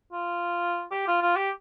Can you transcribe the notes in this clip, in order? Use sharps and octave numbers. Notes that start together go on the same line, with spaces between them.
F4
G4
F4
F4
G4